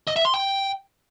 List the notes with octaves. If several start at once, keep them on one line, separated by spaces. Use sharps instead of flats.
D#5
E5
C6
G5